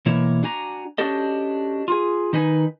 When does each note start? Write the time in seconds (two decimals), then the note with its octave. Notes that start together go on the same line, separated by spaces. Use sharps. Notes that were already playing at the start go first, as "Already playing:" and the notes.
0.06 B2 E3 A#3 E4 C#5
0.43 D4 F#4 G#5 A#5
0.98 C#4 D4 F#4 G4 A4 D#5
1.88 F4 G#4
2.33 D#3 D#4 B4 G#5